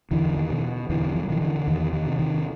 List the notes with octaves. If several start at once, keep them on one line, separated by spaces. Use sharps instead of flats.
E2 D3 E3
D#3
B2
E2 D3 E3
F3
F#3
B2 D#3 F3
D3 E3
E2 D#3
D#3
C3
D#3